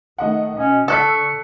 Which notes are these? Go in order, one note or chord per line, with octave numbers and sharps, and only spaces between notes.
D#3 A3 D#5 F#5
B2 C#4 D#5
D3 A4 C#6 E6 F#6 B6